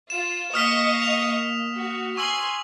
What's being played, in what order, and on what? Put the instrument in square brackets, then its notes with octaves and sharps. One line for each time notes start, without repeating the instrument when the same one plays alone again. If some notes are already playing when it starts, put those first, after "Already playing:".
[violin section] F4 [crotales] E7
[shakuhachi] A#3 [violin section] D#5 F5 C#6 [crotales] D#6 F6 B6
[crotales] F7
[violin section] F#4
[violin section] G#5 C6 [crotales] C#6 E6 F#7